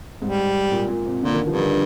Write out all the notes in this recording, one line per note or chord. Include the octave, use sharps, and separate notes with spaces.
G#2 G3
A#2
A#2
C3
A#2 D3
D#3
G2 F3
D3
D#3